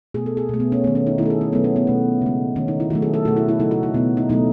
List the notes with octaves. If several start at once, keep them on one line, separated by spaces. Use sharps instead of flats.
B2 A3 G#4
A4
G#4
B2 A3
B3
C#4
D#3 A3 B3
C#4
D#4
D#3 A3 E4 A4
G#4
C#4
B2 F#3 A3 B3
C#4
B3
B2 A3
C#3 G#3
D#3 A3 C#4
D#4
E4
D#3 F#3 A3 F#4
G#4
A4
B2 A3 F#4
E4
E4
C#3 F#3 A3 D#4
F#4
D#4
B2 A3 B3
D#4
B2 F#3 A3 D#4